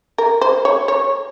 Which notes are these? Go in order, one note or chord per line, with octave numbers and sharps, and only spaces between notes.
A#4
C5
C#5
C#5